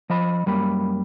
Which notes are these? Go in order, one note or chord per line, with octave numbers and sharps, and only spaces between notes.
F3 D#5 B5
F#2 G3 A#3 B5